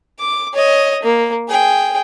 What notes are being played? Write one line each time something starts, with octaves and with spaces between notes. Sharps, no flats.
D6
C#5 D#5
A#3
G#4 G5